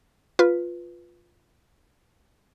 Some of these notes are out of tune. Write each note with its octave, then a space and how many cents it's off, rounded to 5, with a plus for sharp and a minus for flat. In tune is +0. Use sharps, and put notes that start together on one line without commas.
F4 +0 B4 +0